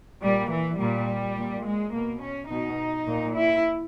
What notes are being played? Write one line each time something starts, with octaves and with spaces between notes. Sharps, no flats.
A#2 G3
E3
A#2 G3
A#2
G#3
B2 A#3
C#4
B2 D#4
A#2
E4